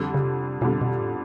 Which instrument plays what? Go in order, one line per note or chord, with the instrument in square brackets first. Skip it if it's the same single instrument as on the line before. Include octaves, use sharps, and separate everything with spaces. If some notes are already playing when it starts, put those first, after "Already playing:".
Already playing: [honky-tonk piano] F2 D3 G3
[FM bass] C#3
C3
[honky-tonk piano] F2 D3 G3 [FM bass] B2
[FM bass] B2
A2